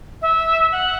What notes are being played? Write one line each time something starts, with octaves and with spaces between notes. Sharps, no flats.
E5
F#5